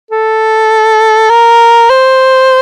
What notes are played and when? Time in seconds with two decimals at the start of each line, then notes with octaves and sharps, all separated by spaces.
0.11 A4
1.30 A#4
1.90 C5